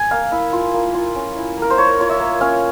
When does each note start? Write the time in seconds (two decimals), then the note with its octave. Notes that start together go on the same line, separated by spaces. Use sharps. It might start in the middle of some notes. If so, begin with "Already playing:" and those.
Already playing: G#5
0.11 A#3 F5
0.32 E4
0.53 F4
0.74 A#3
0.94 F4
1.15 C#4
1.37 E4
1.57 A#3 A#4
1.70 C5
1.78 A#3 C#5
1.99 F4 C#5
2.09 E5
2.20 A#3
2.41 C#4 F5